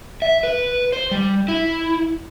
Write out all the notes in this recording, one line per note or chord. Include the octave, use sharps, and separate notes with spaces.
E5
B4
C5
G3
E4